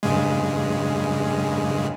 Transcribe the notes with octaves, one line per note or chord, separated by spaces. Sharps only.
G2 C#3 G#3